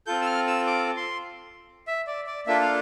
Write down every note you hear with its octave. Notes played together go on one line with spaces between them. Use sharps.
C4 F4 A4 G6
E6
F6
E6
D6
C6
E5
D5
D5
A#3 D4 F4 A4 E5
F5